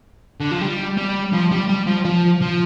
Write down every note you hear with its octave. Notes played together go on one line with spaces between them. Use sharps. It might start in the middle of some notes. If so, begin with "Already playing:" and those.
D3
F3
G3
G3
F3
G3
G3
F3
F3
F3